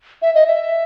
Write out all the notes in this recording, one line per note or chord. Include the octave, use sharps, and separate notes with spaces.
E5
D#5
E5